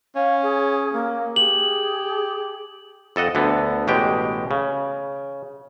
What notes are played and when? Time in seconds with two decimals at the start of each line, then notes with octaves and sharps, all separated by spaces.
0.16 C#4 F5
0.42 G#4
0.93 A#3
1.36 G4 G#4 F#7
3.16 F2 A4 D#5 F#5
3.35 D2 D3 B3
3.87 A1 B2 G#3 G4 G5
4.51 C#3